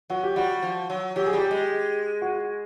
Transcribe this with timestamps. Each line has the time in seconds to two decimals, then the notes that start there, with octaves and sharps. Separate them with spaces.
0.10 F#3 F#4
0.23 G4
0.36 G3 F#4
0.63 F3
0.90 F#3
1.16 F#3 G4
1.27 G#4
1.33 G3
1.38 G4
1.51 G#3
2.22 F#4